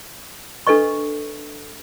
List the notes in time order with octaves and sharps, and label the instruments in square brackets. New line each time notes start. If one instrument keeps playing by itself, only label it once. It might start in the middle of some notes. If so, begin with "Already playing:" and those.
[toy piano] D4 A4 B4 D#5 C#6